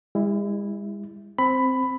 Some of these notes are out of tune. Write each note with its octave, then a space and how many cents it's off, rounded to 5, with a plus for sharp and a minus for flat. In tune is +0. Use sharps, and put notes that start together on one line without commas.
G#3 -40 E4 +0
C4 +0 B5 +10